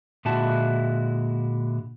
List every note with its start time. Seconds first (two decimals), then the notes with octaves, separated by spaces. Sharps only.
0.25 A#2 D3 G#3 E4 F#4 A5